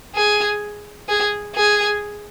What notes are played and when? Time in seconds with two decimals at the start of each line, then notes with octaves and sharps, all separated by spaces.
0.15 G#4
1.09 G#4
1.55 G#4